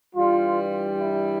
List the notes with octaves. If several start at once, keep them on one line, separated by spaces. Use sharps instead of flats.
G2 E3 G3 F4
E4